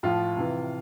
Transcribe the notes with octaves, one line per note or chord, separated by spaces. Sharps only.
A2 F3 F4
C3 E3